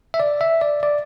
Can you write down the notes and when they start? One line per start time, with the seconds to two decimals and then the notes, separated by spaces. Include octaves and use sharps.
0.14 E5
0.20 D5
0.41 E5
0.61 D5
0.83 D5